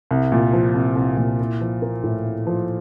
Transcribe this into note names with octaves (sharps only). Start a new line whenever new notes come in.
C2
A#2
F3
C2
C2
A#2
E4
F3
A#3
A2
E4
F3